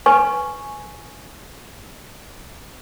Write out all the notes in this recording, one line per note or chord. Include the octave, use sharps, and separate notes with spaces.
B4 G#5 C#6